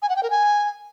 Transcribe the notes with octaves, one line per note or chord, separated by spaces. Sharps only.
G#5
F#5
G5
A#4
G#5